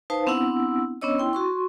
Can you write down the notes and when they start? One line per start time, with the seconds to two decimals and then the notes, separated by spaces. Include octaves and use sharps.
0.10 D#4 B4 C5 F5 A5
0.27 B3 C4 D4 E4 F#5 E6
1.01 B3 C#4 D4 C#5 D#5 E6
1.18 E4 G5 C6
1.33 F#4 C6 C#6